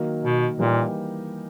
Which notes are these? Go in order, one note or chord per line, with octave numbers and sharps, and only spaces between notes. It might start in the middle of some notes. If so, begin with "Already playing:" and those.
Already playing: D#3 F#3 A#3
B2
A#2 E3 G3 A#3 D#4 G4